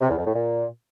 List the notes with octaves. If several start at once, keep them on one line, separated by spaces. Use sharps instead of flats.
C3
E2
F2
A2
A#2